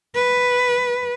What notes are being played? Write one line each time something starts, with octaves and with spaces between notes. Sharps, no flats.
B4